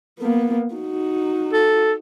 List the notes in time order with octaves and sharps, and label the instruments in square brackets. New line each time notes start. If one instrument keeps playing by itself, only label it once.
[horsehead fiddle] A#3 B3
D#4 F#4
[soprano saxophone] A4